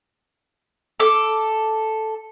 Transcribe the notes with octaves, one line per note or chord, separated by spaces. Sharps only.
A4 D6